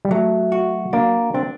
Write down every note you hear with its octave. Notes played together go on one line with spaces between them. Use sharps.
G3
F#3 A3
F#4
A#3 D4
C4 D4